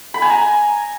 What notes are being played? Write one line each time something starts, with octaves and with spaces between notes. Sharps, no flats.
B5
G#5
A#5